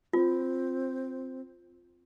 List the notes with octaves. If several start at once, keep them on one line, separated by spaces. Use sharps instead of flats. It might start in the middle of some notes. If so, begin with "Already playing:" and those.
C4 F4